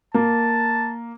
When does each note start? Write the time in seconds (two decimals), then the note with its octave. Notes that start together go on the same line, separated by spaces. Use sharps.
0.14 A#3 A5